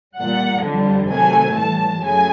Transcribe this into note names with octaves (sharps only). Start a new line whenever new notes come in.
A#2 G3 F#5
F2 D3 G3
C3 D#3 F#3 A3 G#5
A2 E3 G3 A5
F#2 C#3 F#3 A3 G#5